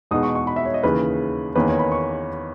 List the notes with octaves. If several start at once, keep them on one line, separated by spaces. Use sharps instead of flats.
E2 B2 G#3 B3 D#4 D#6
C#6
C#6
B5
E5
C#5
D#5
D#2 C#3 E3 B4
E2 D#3 A#3 C#4 B4
C#5
B5
C#6